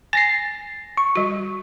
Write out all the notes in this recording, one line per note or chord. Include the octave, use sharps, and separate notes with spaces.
G#5 A6 A#6 C7
C#6
G3 F#4